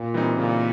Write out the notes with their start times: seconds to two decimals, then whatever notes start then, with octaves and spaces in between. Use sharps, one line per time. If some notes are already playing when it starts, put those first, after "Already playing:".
Already playing: A#2
0.14 E3 G3 C4 D#4
0.38 A#2 C#3